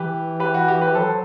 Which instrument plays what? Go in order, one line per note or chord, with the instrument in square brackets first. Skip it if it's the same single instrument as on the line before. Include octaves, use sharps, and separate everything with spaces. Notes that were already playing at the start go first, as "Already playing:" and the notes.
Already playing: [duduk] E3 [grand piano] G4 B4
[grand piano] G4 B4
F#4
G4
G4 B4
[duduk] F#3 [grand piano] A4 C5